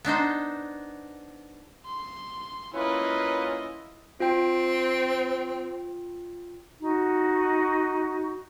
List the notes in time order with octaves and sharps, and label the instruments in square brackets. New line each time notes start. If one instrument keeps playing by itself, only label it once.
[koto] B3 D4 D#4 C5
[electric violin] C6
[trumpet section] A#3 F4 B4 [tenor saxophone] C#4 [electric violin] E4 D#5
[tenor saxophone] C4 [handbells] F4 G5
[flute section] D#4 F#4